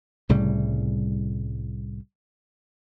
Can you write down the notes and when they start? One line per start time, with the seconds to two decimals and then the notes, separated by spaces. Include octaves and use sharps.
0.29 C2 A2 C#3 G3